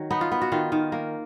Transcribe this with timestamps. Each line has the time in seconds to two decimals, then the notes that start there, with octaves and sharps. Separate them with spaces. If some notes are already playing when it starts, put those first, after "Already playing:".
Already playing: D#3 F#3
0.11 B3 D#4
0.21 F4
0.32 B3
0.42 F#4
0.52 D#3 F4
0.72 D#3
0.92 A#3